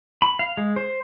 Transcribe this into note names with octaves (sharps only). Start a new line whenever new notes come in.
B5
F5
G#3
C5